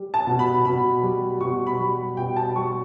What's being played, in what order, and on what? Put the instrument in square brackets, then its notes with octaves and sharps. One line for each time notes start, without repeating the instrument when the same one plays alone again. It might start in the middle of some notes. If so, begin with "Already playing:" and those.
Already playing: [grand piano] G3
[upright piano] A5
[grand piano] B2
[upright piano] B5
[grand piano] B2 [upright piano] B5
[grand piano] G3
[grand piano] B2 [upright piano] C#6
[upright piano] B5
[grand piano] G3
[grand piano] B2 [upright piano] G5
[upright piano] A5
[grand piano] G3 [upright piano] C#6